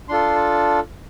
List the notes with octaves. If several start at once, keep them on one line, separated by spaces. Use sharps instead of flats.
D4 F4 A4 C6